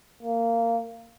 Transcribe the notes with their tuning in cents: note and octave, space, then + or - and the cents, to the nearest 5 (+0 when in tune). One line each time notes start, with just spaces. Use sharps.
A#3 -15